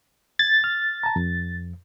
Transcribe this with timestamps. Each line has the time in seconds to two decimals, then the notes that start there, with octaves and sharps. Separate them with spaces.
0.39 G#6 A6
0.64 F6
1.03 A5 A#5
1.16 F2